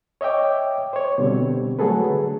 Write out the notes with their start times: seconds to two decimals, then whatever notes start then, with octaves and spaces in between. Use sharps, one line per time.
0.21 C#5 D#5 E5 G5 D6
0.93 C5 C#5
1.18 B2 D3 G3 C4
1.79 F#3 A3 F#4 G#4 A4 B4
2.10 D3